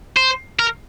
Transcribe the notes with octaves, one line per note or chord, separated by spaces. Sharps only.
C5
A#4